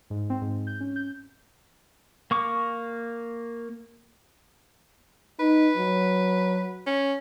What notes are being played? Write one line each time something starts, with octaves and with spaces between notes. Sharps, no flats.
G#2
C4
G#2
G6
C#4
G6
A#3 C#6 D6
D#4 B4
F#3
C#4